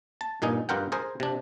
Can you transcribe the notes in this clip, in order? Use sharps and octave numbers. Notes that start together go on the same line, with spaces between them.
A5
G2 A#2 D#4 G#5
G2 F4 A#4 F#5 G5
G#4 A#4 C5
C3 D4